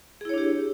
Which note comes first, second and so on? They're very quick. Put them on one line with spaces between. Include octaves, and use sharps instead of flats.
G#4 E4 C#5 D4 G4